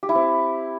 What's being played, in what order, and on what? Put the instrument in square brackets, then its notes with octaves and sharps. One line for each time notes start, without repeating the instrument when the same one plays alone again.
[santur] G4
E4
C4